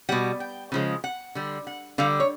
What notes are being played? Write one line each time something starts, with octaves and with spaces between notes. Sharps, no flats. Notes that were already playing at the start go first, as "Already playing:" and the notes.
B2 G3 F#5
G5
C#3 F3 G#3
F#5
D3 G3
F#5
D3 G3 F5
C#5